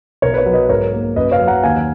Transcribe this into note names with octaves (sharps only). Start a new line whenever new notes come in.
B1 A#4 C#5
B4
A#4 C#5
F#3
B4 D#5
G#2 A#4 C#5
A#3
F#2 B4 D#5
C#5 F5
F#3
F#5 A#5
D#2 F5 G#5